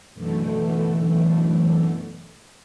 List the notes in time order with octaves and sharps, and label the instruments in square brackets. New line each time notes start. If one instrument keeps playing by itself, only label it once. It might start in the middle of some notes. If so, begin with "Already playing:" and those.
[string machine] F#2 B2 D3 E3 A3